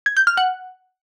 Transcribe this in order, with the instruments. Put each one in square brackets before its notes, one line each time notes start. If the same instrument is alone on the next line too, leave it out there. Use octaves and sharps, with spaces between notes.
[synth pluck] G#6
G6
F6
F#5